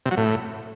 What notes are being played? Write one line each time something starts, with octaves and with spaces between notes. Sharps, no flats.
C3
F#3
A2